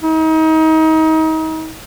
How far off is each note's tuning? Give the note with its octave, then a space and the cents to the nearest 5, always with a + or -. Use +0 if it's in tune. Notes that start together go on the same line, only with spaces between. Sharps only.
D#4 +35